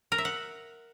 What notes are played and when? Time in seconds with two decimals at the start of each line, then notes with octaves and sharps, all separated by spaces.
0.12 A#4
0.18 E5
0.25 F#5